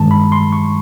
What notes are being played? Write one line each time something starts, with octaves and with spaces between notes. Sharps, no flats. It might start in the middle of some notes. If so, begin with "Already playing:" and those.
Already playing: G2 D#3 G#3 A5
B5
C6
C#6